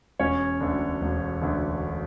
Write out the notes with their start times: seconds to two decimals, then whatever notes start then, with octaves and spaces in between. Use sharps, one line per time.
0.19 E1 C#4 C#5
0.61 D2 D3
1.02 E1
1.41 D2 D3